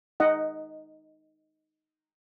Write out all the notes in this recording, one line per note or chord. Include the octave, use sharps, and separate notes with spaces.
D#4 D#5 F#5